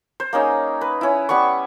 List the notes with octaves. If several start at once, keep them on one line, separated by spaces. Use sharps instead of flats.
C5
A#3 C#4 D#4 G#4
B4
C#4 E4
G3 B3 B5 C#6